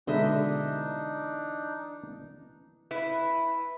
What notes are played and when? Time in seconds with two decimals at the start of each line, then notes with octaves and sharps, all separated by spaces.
0.07 B2 D3 E3 G#3 D4 D#4 D#5 E5
2.91 E4 B4